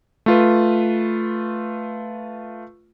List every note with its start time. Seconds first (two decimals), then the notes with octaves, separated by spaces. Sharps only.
0.26 A3 F4 B4